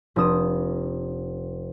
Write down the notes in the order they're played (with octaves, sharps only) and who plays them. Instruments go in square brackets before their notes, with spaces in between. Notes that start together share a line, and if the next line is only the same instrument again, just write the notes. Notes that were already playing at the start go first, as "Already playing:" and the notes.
[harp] F1 D4 D#6 E7